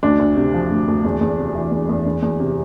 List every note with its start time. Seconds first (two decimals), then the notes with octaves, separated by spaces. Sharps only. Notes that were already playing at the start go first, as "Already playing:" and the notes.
0.03 D2 D4
0.19 D2
0.37 C3
0.54 F3
0.70 D2
0.88 D2
1.04 E2
1.21 E2
1.38 C3
1.55 E3
1.71 E2
1.89 E2
2.06 E2
2.22 E2
2.40 C3